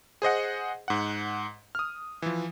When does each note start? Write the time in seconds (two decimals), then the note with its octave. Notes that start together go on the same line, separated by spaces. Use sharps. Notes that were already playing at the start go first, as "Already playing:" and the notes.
0.22 G#4 C5 D#5 F#5
0.88 G#2 F#5
1.75 D#6 F6
2.22 E3 F3